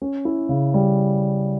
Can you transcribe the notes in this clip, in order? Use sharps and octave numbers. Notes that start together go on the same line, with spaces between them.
C#4
E4
C#3
G3